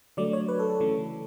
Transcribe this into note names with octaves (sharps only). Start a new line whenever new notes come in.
D3 F#3 A3 D5
C#5
B4
A4
A4
C#3 E3 A3